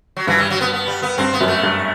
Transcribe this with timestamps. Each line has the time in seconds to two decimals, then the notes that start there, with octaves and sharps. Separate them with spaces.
0.16 F#3
0.27 G2 E3
0.38 G3
0.50 F#3
0.61 B3
0.73 B3
0.88 G3
1.02 B3
1.18 G2 C4
1.33 B3
1.41 F#2
1.48 A3
1.63 G2